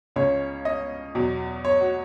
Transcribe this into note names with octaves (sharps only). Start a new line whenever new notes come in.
C#2 C#3 G#3 C#5
D#5
E2 B2 F#3
C#5
F#4